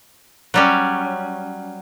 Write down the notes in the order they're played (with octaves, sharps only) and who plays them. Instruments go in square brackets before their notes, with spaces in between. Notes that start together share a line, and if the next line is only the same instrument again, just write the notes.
[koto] F#3 G3 C#4